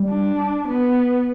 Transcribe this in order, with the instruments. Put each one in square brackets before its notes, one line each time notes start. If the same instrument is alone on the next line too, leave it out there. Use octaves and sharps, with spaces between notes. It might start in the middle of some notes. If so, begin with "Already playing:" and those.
Already playing: [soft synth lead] G3
[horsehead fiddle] D4
B3